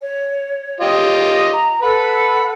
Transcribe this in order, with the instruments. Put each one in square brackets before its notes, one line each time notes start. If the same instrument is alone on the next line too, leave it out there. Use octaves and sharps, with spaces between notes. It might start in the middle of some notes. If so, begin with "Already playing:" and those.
[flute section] C#5
[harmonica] F4 G4 D#5
[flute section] A#5
[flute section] A4 F#5 [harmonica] B4 B5